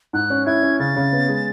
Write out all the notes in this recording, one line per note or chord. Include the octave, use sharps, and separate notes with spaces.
G#2 F#6
C#4
E4 G#6
C#4
C#3 A6
C#3
B3
G#3